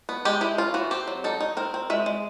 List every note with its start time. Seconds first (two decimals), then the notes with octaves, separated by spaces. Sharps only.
0.09 B3
0.25 G#3 G4
0.41 G#3 E4
0.58 C#4 F4
0.74 E3 F#4
0.91 C4 G4
1.08 F#3
1.24 D#4 A4
1.40 D#4
1.57 C4 A#4
1.74 C4
1.90 G#3 E5
2.06 G#3